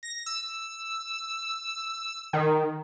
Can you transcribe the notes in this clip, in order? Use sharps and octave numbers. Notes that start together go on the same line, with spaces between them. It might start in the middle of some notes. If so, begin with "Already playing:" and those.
A#6
E6
D#3